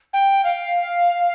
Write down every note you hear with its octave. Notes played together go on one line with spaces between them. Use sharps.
G5
F5